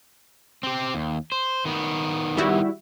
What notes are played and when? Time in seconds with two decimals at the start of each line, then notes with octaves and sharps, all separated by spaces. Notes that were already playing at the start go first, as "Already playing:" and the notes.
0.63 C4 G4
0.94 D#2
1.32 C5
1.65 D#3 B3
2.37 G3 E4 F#4